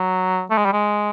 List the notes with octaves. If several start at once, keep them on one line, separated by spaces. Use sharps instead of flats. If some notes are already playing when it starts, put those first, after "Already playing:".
Already playing: F#3
A3
G#3
G3
G#3